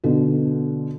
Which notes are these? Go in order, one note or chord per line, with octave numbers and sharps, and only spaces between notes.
B2 D3